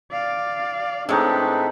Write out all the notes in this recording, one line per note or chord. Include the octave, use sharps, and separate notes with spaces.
D5 F5
A2 G#3 C4 D4 D#4 A4 B4 C#5